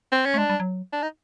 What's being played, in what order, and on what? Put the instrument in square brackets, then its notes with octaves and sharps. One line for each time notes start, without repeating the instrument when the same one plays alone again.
[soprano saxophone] C4
C#4
[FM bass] A3
[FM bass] G#3 [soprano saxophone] D4
[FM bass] G3
F#3
[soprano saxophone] D4
D#4